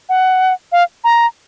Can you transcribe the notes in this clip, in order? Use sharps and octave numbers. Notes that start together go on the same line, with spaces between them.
F#5
F5
A#5